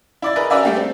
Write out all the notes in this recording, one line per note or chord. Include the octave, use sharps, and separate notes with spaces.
E4 D5 A6
G#4 A#4 B4 D#5
C#4 F#4 A#4 D5 E5 G#5
G3 A3 A#3 G4 A4
C4